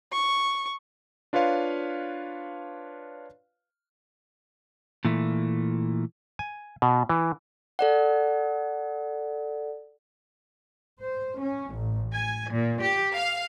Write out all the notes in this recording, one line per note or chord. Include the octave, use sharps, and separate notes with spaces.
C#6
D4 F4 B4 C#5 F5 C6
A#2 E3 A3
G#5
B2
E3
A4 D5 F#5
C5
C#4
A1
G#5
A#2
G4
F5